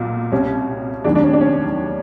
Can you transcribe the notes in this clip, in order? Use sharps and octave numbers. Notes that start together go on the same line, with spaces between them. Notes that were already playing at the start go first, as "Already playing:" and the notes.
Already playing: B1 A#2
C2 B2 G3 C#4
F1 D#2 D#3 F#3 D4
D4
C#4
D4
C#4